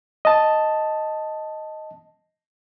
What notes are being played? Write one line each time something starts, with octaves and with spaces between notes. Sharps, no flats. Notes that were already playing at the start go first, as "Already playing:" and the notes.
D#5 A5